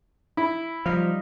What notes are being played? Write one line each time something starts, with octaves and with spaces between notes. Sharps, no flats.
E4
F3 G3 D#4 F5